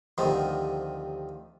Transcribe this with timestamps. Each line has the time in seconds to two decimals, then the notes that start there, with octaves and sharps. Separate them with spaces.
0.18 D2 C3 D#3 F3